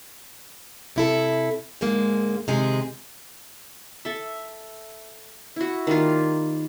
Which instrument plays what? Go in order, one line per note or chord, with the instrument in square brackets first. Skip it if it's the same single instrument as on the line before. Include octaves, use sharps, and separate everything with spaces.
[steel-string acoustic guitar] C3 E4 A4
G#2 D3 G#3 A#3
C3 D#3 G#3 G#4
[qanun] A4 E5
E4 F#4
D#3 G3 A#3 F4